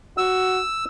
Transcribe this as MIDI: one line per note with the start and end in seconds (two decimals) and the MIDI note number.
0.18 0.60 66
0.18 0.85 88